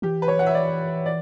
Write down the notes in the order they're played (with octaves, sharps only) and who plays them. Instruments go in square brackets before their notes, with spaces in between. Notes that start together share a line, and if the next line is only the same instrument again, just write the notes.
[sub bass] E3 [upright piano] G4
[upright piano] B4
C#5
F#5
E5
D5
D5